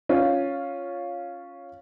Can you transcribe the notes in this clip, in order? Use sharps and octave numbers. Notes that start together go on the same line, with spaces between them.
C#4 F4